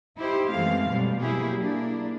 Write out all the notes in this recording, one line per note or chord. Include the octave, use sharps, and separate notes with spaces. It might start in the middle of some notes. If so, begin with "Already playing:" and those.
D#4 E4 G4 C5
F#2 E3 G#3 A3 C4 F5
B2 F#3 G3
F#3 A#3 E4 G4 G#4
A#3 D4 E4